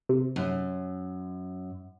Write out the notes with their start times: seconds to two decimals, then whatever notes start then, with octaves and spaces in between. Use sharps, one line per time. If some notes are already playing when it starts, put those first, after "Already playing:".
0.09 C3
0.36 F#2